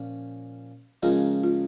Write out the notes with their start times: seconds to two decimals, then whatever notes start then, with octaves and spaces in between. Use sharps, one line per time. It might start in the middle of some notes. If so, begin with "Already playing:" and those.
Already playing: A#2 F3 C#4
1.03 C#3 F3 G#3 D#4 F4 A#4
1.43 F4